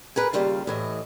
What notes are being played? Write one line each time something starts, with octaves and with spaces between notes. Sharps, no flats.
G#4 A#4 B4
D#2 A#2 C#3 G3 F4 F5
A2 E3 D#5